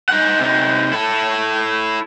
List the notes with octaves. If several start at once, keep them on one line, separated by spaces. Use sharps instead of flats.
D#4 F#5
C3 D#4
E4 A4